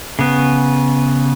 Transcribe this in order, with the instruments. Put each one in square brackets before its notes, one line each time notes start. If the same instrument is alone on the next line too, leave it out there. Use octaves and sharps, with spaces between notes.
[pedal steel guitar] C#3 B3